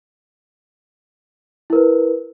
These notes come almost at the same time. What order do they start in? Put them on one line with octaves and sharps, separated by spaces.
E4 A#4 B4